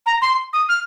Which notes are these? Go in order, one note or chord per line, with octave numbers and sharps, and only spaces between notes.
A#5
C6
D#6
F6